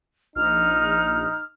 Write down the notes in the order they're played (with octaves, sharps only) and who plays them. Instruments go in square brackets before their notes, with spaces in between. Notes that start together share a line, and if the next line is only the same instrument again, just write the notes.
[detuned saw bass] A#1 [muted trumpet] D#4 [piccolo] F6